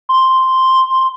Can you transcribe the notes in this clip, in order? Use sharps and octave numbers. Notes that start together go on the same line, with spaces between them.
C6